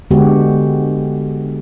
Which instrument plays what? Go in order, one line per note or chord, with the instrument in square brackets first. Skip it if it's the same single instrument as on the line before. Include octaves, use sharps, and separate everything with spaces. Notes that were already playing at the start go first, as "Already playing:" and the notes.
[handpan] D3 G#3 B3 F#4 G4